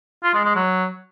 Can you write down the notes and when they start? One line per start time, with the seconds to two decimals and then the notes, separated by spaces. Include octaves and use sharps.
0.23 F4
0.34 G#3
0.45 G#3
0.55 F#3